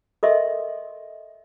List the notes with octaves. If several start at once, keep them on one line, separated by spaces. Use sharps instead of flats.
A4 A#4 D#5 E5 C6